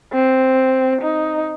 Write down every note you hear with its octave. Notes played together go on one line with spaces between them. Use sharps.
C4
D#4